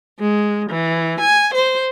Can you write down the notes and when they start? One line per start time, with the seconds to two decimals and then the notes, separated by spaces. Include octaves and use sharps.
0.19 G#3
0.70 E3
1.20 G#5
1.54 C5